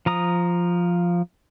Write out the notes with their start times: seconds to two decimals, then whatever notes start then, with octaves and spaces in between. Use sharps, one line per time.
0.06 F3 A#5 D#6